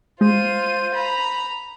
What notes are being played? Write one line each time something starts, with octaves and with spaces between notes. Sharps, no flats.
G#3 F4 C5 D#7
A#5 B5